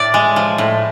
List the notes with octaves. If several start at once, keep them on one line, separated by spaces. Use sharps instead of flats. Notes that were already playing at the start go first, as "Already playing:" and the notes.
Already playing: A2 D5
G#3
F3
A2